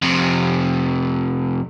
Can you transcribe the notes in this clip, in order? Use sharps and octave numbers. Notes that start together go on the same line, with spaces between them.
F2 C3